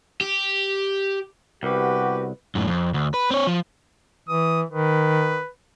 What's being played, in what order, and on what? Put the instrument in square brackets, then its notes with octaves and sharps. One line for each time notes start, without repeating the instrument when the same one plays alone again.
[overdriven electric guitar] G4
[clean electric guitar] C2 [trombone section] B3 F#4 [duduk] G4 [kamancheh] B4
[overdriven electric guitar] F#2 A2
F2
D2
B4
C4 C#5
F3
[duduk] E3 [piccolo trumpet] D#6
[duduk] D#3 [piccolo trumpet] B4